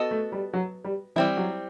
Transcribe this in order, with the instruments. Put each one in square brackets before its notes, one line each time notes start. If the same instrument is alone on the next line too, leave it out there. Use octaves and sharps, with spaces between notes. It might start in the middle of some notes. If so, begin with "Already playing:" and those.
Already playing: [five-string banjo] B3 F#4 A4 D#5
[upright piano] A3
G3
F#3
G3
[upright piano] E3 [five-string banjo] G3 C4 E4
[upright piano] F#3